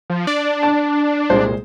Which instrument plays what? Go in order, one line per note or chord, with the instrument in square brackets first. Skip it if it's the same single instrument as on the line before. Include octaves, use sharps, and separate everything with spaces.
[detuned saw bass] F3
[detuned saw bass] D4 [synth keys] D5
[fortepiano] A5
[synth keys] C2 A#2 [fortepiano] G#3 C5